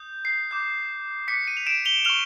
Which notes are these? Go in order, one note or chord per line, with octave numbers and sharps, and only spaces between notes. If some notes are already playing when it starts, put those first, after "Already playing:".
Already playing: D#6 G6
C7
D6 G6
D6 F#6 B6 C#7
C#7 D#7
F7
D7 E7
F7 G7
C#6 F6 F7 G7